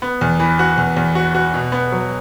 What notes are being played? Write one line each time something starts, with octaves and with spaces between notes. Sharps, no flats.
B3
E2
E3
F#4
E2
E2
F#4
F#4
B2
B3
F#3